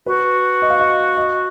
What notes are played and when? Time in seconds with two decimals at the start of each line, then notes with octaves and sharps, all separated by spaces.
0.06 F#4 B4
0.62 D#5
0.70 F5
0.80 D#5
1.17 D#5